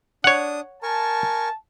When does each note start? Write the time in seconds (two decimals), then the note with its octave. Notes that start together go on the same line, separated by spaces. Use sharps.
0.24 D4 C#5 F#5 D#6
0.83 A#4 G#5 A5 C#6